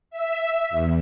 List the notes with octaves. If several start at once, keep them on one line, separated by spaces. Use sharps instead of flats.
E5
E2